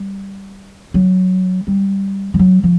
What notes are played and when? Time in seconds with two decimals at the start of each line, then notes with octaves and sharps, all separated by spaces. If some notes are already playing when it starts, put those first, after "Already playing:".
Already playing: G3
0.94 F#3
1.67 G3
2.34 F3
2.39 F#3
2.63 F3